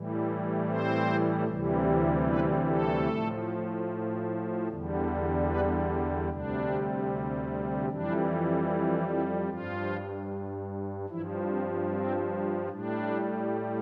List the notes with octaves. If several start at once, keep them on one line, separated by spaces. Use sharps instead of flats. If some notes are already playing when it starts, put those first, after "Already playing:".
Already playing: A2 E3 G3
C4 C5
D2 C3 E3 G3
B3 B4
A3 A4
A2 F3
E2 D3 G3
B3 B4
D4
D2 C3 G3 D4
F2 E3 G3 D4
E3 E4
G2 F3 F4
G2 E3 F3 E4
C4
C4
A2 G3 D4